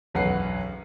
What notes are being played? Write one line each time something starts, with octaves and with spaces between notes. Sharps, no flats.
E1 B1 F#2 B4 F#5 C7